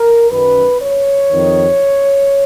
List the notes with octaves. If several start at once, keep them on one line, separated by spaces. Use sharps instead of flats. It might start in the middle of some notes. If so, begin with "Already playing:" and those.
Already playing: A#4
F#2 D#3 B4
C#5
F2 D#3